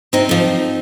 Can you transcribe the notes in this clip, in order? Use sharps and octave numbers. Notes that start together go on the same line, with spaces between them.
C3 C4 D#4
F3 A3